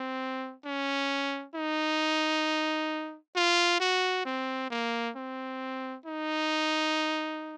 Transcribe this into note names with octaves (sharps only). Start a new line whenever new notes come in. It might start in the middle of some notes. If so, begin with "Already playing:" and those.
Already playing: C4
C#4
D#4
F4
F#4
C4
A#3
C4
D#4